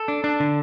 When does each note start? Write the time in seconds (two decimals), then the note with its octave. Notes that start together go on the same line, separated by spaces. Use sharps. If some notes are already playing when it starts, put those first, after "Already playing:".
Already playing: A4
0.08 D4
0.24 D4
0.40 D3